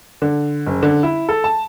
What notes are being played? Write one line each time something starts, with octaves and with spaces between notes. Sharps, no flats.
D3
F#1
D3
E4
A4
A5